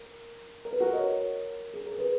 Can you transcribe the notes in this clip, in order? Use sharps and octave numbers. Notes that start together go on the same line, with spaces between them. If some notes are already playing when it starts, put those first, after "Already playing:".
Already playing: A#4
A#4
B4
F#4 A#4
D#5
A#4 C#5
G#4
A#4
G#4 B4